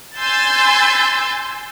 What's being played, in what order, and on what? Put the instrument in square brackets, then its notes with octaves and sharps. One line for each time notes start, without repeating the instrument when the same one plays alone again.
[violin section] G#5 C6 E6 G6 A6